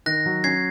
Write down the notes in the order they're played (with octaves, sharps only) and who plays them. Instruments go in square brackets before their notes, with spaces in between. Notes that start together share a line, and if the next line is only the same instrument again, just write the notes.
[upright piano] D#3 [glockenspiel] F#6 A#6
[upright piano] F#3
[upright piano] C#4 [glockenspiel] G#6 C7